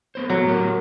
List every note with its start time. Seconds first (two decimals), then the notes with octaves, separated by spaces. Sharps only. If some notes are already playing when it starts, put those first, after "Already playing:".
0.15 A#3 B3 C5
0.30 F#3 A3 B3
0.44 A2 G4 A#4